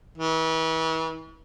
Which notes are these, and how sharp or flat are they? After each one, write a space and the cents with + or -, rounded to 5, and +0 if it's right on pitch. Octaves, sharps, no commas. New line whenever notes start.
E3 -35